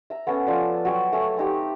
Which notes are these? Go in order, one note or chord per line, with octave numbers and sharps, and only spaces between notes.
E5 A#5
B3 C#4 A4 G#5
F3 A4 D5
F#3 G5 G#5 C#6
A3 C#5 G#5 A#5
C4 D#4 G4